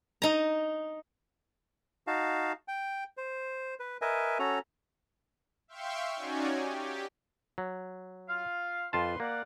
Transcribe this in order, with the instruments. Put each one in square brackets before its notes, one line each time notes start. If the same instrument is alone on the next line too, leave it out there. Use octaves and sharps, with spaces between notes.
[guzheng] D#4 A#5
[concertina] D#4 F#4 F5 A5
G5
C5
B4
A#4 B4 D#5 E5 G#5
C#4 F#4 A4 A#5
[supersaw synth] E5 F5 G5 C6 C#6
C#4 D#4 F#4 C#5 D5 G#5
G4
[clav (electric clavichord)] F#3
[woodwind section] F4 F5
[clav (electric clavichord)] F2 F4 A5 [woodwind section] B4 C5 C6
[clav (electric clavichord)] A#3 [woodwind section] D5 F5 F#5